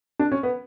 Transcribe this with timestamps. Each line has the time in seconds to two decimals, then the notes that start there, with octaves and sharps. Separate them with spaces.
0.19 D4
0.32 C#4
0.43 B3